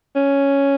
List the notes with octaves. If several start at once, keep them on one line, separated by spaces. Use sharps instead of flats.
C#4